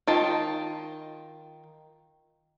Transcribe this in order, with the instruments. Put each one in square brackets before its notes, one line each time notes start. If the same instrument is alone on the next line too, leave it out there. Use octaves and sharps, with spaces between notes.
[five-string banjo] D#3 F4 A5